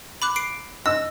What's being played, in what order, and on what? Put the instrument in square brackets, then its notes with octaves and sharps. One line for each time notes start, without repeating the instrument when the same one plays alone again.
[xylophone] B5 D6 F#6
C7 D7
[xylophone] D#5 [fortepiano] E6